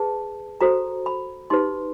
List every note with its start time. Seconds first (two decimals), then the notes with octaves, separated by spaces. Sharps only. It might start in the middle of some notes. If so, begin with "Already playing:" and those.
Already playing: G#4 B4 A5
0.61 F#4 A4 C5 A#5
1.06 B5
1.50 D#4 G4 B4 C6